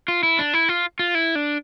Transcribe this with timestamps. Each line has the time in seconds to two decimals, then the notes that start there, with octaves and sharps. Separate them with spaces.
0.08 F4
0.23 E4
0.39 D4
0.53 E4
0.69 F4
0.99 F4
1.15 E4
1.35 D4